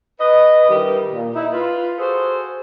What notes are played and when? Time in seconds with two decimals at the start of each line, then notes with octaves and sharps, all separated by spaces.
0.20 B4 D#5
0.70 G2 D#3 E3 G3 G4 A#4
1.13 A#2
1.35 D#4 E4
1.53 F4 B4
1.99 F#4 G#4 A4 C5